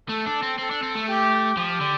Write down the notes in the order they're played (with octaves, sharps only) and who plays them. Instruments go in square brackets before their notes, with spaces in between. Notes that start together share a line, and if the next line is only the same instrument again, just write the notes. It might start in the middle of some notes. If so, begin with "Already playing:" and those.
[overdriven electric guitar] A3 [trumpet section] A4
[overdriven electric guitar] D4
C4
[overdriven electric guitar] C4 [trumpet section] A4
[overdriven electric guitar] D4
C4
A3
[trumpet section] G4
[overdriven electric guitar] F3 [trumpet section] G4
[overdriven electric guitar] D3